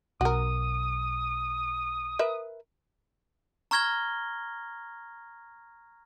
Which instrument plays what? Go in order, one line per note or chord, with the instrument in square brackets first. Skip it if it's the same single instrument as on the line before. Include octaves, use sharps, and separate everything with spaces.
[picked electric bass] B1 [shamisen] F#4 A#4 [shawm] D#6
[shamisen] A#4 B4 E5
[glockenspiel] A#5 C#6 F6 G#6 A#6 G7